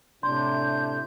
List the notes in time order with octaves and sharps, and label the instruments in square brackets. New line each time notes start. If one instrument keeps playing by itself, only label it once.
[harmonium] A2 C3 [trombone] D4 [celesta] C6 [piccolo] G6